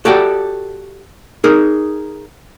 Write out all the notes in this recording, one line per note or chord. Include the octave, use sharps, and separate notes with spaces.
F#4 G4 A4 D5 F#5 G5
D#4 G#4 A#4